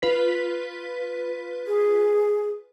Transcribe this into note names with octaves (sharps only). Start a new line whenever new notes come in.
F4 B4 B6
G#4